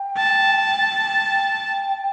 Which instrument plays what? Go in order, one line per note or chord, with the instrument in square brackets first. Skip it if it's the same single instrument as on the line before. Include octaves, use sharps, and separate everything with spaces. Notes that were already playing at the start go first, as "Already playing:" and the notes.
Already playing: [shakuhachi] G5
[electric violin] A5
[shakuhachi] G5